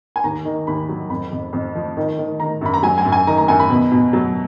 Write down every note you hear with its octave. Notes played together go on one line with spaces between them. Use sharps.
G#5
D#2 A#5
D#3
D#2 B5
F#3
F2 B5
F2
F2
F3
D#3
D#3
D#3 A#5
F#2 B5
A#5
F#3 G#5
G#5
F#2
G#5
D#3 A#5
A#5
F#2 G#5
B5
B2
B2
F#3